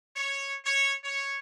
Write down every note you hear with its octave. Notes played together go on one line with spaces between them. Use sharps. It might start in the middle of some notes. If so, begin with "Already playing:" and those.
C#5
C#5
C#5